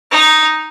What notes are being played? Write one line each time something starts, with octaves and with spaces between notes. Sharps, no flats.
D#4